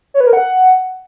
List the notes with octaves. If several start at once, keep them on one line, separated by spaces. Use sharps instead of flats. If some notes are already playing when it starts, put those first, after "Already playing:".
C#5
B4
A#4
F#5